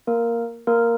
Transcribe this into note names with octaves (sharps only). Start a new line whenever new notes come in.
A#3 A#4
A#3 A#4